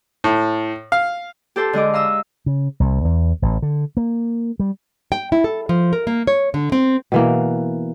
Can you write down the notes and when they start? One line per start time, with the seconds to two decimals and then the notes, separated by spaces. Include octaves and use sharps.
0.24 A2
0.92 F5
1.56 G4 A4 C5 A5
1.73 D3 G#3 D#5 D6
1.93 F5 A#5 D#6 E6
2.46 C#3
2.80 C2
3.05 E2
3.42 A1
3.62 D3
3.97 A#3
4.60 G3
5.12 G5
5.32 E4
5.44 A4
5.69 F3
5.93 A#4
6.07 A#3
6.27 C#5
6.54 D3
6.72 C4
7.12 B2 E3 A#3